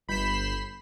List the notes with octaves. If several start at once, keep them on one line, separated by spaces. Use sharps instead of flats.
G1 B5 G6 B6 C7 E7